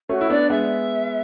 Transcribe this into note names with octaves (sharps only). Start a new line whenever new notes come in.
A3 C#4 F#4
E4
B3 D4 D5
G#3 B3 E5